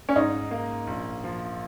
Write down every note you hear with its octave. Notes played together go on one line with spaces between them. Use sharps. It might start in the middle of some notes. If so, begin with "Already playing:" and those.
C#4
G#2 D#4
A#3
A#1
F3